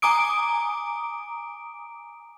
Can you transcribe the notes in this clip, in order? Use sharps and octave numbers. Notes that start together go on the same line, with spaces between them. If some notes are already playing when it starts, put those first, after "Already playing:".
G#5 A#5 D6 D#6 D7